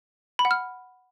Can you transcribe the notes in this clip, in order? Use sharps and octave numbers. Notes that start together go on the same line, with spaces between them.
B5
F#5
F6